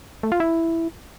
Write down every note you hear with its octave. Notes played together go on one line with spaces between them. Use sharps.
A3
F4
E4